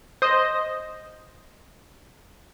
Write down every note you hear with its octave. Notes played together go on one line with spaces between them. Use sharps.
C5 D#5